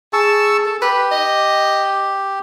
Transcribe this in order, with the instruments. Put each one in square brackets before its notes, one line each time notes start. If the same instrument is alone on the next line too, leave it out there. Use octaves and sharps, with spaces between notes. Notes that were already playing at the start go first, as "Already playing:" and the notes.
[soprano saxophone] G#4 [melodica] A5 C#6 E6
[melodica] A4
[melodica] G4 [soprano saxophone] B4
[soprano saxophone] D#5